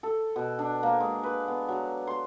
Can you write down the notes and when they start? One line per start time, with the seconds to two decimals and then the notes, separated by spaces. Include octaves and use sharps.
0.03 A4
0.36 B2
0.59 D4
0.83 A#3
1.00 G#3
1.23 B4
1.48 B3
1.69 F#3
2.07 C6